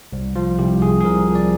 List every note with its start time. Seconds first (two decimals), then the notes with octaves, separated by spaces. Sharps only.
0.12 C2
0.36 F3 F4
0.59 C2 G4
0.82 C3 G#4
1.01 G#4
1.04 C2 A#4
1.28 F3
1.35 D5